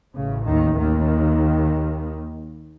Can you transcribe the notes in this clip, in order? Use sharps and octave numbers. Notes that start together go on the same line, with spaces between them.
A1 A2 C#3
D#2 D#3
D#2 D#3